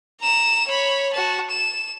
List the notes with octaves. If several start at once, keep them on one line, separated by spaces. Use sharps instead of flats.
A#5 E7
C#5 B5
F#4 A5
E7